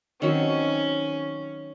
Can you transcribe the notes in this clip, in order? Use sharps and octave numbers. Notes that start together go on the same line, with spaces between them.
D#3 F#3 C4 C#4